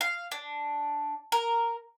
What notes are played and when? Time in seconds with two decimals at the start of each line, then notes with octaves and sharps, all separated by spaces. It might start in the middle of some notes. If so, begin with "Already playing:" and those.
0.01 F5
0.32 D4
1.32 A#4